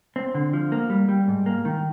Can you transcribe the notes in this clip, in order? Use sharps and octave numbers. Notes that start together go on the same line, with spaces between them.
C4
D3
F3
A#3
G3
G3
G#2
A#3
D#3